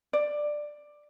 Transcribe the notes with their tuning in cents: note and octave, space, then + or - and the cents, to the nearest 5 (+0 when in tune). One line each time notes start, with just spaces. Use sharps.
D5 +10